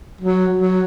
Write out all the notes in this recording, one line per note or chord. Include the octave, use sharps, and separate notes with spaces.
F#3
F#3